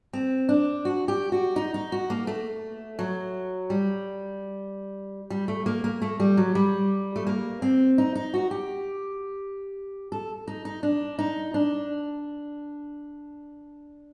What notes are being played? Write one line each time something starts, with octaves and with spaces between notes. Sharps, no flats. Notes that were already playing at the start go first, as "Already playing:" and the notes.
C4
D4
F#4
G4
F#4
D#4
D#4
F#4
A#3
A3
F#3
G3
G3
A3
A#3
A#3
A3
G3
F#3
G3
A3
A#3
C4
D#4
D#4
F#4
G4
A4
D#4
D#4
D4
D#4
D4